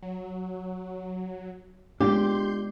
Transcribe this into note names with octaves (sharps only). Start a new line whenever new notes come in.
F#3
G#3 B3 D4 F4 G4 D5 C6 G6